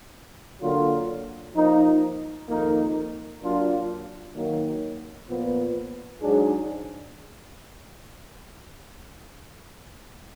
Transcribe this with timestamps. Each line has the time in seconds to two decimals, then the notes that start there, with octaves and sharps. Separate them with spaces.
0.61 D3 F#3 A#3 F4
1.54 F3 A#3 D#4
2.48 F2 D#3 A#3 D#4
3.42 F#3 A#3 D4 F4
4.34 D#3 F#3 A#3
5.28 A#2 F3 B3
6.21 G#2 F#3 D4 G#4